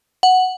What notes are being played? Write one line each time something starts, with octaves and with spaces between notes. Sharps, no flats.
F#5